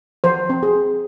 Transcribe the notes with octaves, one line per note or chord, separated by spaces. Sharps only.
F3 C5
C4
G#4
C4